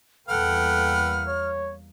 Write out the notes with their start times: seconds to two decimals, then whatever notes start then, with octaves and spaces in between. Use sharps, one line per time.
0.28 E2 G3 A#3 A4 B4 F#5 G5 F6
1.27 C#5